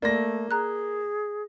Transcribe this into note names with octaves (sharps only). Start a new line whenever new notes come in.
A3 A#3 D5 A#6
G#4 A#5 F#6